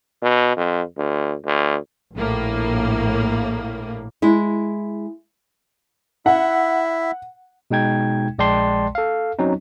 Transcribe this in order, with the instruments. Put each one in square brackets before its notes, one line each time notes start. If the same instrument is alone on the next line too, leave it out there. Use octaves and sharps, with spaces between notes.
[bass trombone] B2
F2
D2
D2
[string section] A#1 A2 A#3
[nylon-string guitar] G#3 E4
[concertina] E4 E5 [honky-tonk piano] F#5
[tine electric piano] B2 G#3 D#4 G5 G#6
A#1 G#3 D5 G5 A5 C6
A4 F5
F#3 C4 C#4 D#4